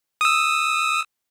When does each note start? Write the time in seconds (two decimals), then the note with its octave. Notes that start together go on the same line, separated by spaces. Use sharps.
0.21 D#6 E6